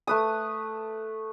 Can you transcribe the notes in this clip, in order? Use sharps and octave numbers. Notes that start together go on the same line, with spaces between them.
A3 B4 D#6